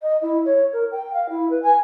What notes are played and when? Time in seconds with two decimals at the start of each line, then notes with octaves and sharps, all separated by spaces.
0.01 D#5
0.21 E4
0.45 C#5
0.72 A#4
0.92 G5
1.13 F5
1.29 E4
1.50 B4
1.62 G#5